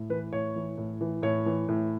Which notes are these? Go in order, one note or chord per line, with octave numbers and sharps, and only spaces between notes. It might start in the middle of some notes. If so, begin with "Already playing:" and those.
Already playing: A2
E3 B4
A2 C#5
E3
A2
E3
A2 C#5
E3
A2